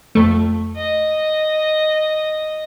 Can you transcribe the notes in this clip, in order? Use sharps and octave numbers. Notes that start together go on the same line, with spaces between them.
F2 A3
D#5